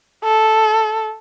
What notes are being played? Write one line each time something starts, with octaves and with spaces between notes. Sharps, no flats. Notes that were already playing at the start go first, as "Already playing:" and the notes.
A4